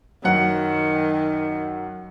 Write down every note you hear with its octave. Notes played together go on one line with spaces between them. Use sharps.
F#2 D#3 F#5